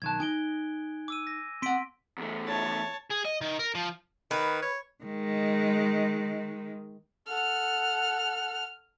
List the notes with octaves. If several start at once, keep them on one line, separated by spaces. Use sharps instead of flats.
B1 D#3 A5 F#6 G#6
D#4 G#5 D7 G7
D6 E6 D#7
A#6
C4 F#5 C6 B6 D7
E2 A3
C#5 A5
G#4
D#5
D#3
A#4
F3
D#3 B4
C#5
D#3 G#3
A4 F#5 F6